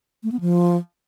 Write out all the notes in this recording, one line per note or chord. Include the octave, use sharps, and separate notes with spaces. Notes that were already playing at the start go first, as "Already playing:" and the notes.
A3
B3
F3